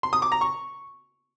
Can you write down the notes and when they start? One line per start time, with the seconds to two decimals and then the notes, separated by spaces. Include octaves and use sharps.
0.03 C6
0.13 D#6
0.22 D6
0.32 A#5
0.41 C#6